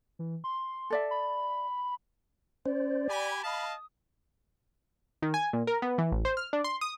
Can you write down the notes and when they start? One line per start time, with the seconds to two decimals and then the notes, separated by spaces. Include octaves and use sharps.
0.19 E3
0.44 C6
0.90 A4 D5 E5
1.11 B5
2.66 C#4 C5 D5
3.09 G4 G#5 B5
3.44 D#5 F5 A5 D#6
5.22 D#3
5.34 G#5
5.53 A#2
5.67 A#4
5.82 B3
5.98 E3
6.12 A1
6.25 C5
6.37 F6
6.53 D4
6.64 C6
6.81 D#6